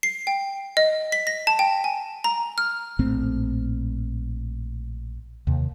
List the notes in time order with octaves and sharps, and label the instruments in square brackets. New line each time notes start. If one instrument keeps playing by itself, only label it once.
[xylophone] C7
G5
D#5
B6
A#6
A5
G5
G#5
A#5
F6
[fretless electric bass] A#1 A2 A3 C4
D#2 C3